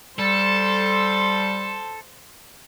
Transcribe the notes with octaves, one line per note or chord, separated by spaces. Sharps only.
G3 A4 C5 C6